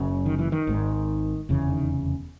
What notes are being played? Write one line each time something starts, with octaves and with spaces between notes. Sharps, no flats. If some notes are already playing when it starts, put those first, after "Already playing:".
Already playing: F#1 F#2 C#3
D#3
E3
D#3
G#1 G#2
F1 E2 C#3
D#3